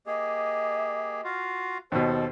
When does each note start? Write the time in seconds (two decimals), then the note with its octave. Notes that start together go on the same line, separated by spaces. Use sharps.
0.07 A#3 G4 G#4 D#5
1.24 F4 F#4 F5
1.92 D#2 B2 A4 C5